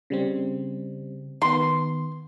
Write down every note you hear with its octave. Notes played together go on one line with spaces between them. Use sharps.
C#3 G3 C4
D#3 B3 C6